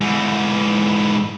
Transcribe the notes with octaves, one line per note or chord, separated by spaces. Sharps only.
G#2 E3